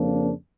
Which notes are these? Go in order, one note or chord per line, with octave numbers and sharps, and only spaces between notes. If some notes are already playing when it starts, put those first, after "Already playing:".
Already playing: F2 C#3 F3 A#3 D4